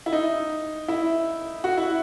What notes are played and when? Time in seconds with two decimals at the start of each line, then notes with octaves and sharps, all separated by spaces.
0.06 E4
0.12 D#4
0.88 E4
1.64 F#4
1.77 E4